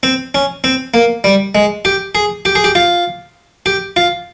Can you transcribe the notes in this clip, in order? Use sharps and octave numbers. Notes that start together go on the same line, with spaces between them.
C4
C#4
C4
A#3
G3
G#3
G4
G#4
G4
G#4
G4
F4
G4
F4